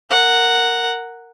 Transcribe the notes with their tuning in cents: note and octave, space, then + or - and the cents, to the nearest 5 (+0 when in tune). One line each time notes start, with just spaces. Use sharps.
A#4 -10 F#5 +0